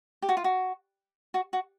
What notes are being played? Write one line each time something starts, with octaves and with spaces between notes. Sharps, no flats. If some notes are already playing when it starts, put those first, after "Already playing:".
G4
F#4
F4
F#4
F#4
F#4